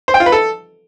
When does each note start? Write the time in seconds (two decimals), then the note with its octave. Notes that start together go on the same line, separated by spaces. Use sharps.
0.08 C5
0.14 G5
0.20 F4
0.26 B4
0.32 A4